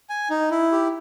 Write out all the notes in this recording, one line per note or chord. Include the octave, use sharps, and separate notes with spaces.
G#5
D#4
E4
G4